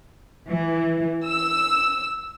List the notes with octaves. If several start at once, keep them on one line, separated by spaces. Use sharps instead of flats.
E3
E6